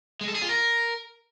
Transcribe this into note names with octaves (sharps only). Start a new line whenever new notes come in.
G#3
A4
G#4
F4
A#4